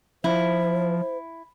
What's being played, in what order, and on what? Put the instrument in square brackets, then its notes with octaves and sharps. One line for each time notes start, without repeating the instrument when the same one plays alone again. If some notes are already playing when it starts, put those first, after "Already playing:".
[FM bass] F3 [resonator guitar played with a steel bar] E4 [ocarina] C5